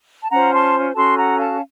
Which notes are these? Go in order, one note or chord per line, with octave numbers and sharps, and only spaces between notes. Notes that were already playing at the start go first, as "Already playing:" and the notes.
A5
C#4 F4 C5 F#5 A#5
A5 C6
C#4 F#4 A4 A5 C6
F#5 A#5
F5 A5